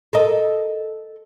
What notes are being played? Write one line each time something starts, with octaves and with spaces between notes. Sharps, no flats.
A4 A#4 D#5